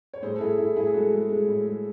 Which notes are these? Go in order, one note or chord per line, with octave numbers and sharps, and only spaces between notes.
C#5
A2 G#4 C5
A4
A2 E4 G#4
A2 E4
A2 E4 G#4
G#4
G#3 F#4 A4
G#3
G#3
A2
G#3